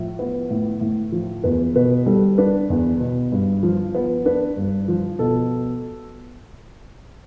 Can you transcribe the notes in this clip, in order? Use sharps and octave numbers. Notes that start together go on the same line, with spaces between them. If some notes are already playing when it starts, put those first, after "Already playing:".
Already playing: A2 F3
B3
A2
A2
F3
E2 B4
B2 B4
G3 A4
D4 B4
E2
B2
G2
F3
B3
D4 B4
G2
F3
B2 A4